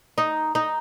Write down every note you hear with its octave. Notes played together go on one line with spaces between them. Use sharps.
D#4
D#4